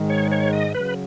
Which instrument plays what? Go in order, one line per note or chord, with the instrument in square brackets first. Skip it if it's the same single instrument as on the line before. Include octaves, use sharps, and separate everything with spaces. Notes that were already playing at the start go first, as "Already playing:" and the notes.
Already playing: [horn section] G#2 D#3 G#3
[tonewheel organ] C#5
C#5
D#5
[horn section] C#3 F#3 [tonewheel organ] B4